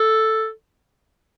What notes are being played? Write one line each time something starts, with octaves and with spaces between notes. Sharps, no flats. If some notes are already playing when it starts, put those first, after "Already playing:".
Already playing: A4